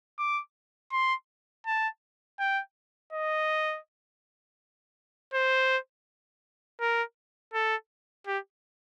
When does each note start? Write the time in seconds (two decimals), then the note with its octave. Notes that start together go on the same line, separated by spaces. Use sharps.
0.19 D6
0.92 C6
1.66 A5
2.39 G5
3.13 D#5
5.34 C5
6.81 A#4
7.54 A4
8.27 G4